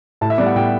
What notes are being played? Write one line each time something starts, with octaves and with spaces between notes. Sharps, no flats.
A2 A5
E5
G3 B3 D5
F#5
A2 G5